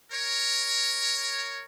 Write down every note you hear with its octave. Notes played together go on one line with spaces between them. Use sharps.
A#4 C#5